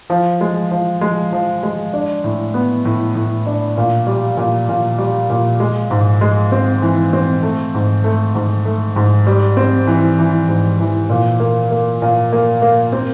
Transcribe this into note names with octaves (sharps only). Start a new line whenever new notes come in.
F3
G#3
F3
G#3
F3
G#3
D4
A2
B3
A2
A2
D4
A#2
G3
A#2
A#2
G3
A#2
G#3
G#2
G#3
C4
E3
C4
A3
G#2
A3
G#2
A3
G#2
G3
C4
E3
E3
G#2
E3
A#2
A#3
A#3
A#2
A#3
A#3
C4